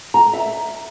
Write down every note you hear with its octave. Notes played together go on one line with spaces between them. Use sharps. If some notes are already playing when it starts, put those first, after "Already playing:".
A#5
E5